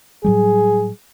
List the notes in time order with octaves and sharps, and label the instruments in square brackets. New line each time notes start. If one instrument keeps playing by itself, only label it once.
[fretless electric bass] A2 F#3 G3 [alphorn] G#4